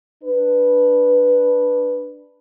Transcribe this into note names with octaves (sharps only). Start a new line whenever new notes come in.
D4 B4